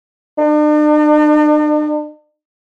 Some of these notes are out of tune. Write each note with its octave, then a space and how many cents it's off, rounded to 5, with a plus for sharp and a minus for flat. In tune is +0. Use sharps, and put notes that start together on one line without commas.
D4 +45